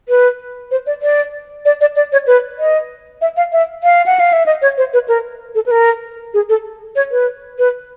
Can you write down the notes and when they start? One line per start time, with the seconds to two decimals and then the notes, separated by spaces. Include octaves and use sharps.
0.09 B4
0.71 C5
0.87 D5
1.02 D5
1.65 D5
1.81 D5
1.96 D5
2.12 C#5
2.27 B4
2.59 D#5
3.21 E5
3.37 F5
3.52 E5
3.84 F5
4.06 F#5
4.20 F5
4.33 E5
4.46 D#5
4.62 C#5
4.78 C5
4.93 B4
5.08 A#4
5.55 A4
5.66 B4
5.71 A#4
6.34 G#4
6.49 A4
6.96 C#5
7.12 B4
7.59 B4